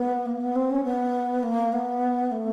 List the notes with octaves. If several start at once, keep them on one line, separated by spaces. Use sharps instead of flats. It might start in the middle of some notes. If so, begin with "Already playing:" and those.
Already playing: B3
A#3
B3
C4
C#4
B3
A#3
B3
A3